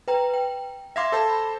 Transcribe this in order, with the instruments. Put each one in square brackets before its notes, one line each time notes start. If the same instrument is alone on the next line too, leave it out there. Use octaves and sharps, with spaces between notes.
[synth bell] B4 G5 A#5
G5
[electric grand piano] E5 F5 C6 [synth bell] D6 G#6 A#6
[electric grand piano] A4 C5 A5
[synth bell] B5